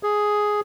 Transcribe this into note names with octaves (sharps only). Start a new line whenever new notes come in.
G#4